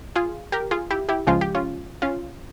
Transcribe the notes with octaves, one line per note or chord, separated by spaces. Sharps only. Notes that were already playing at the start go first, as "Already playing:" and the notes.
Already playing: C2
F4 G#4
G4 A#4
F4 G#4
E4 G4
E4 G4
C#2 C#3 F3 G#3 F4
G4
C#4 F4
C#4 F4